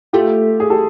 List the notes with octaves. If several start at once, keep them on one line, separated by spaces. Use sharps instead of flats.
A3 F4 G4
G#4
G4 A4